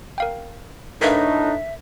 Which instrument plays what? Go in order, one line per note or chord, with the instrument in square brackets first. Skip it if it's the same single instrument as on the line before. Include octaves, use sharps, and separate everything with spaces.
[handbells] A#4 F5 G5
[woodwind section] A2 D4 [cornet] D#4 [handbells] A#4 B4 F5 [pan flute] E5